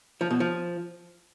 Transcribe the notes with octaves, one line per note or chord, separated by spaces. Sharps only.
F3
B2
F3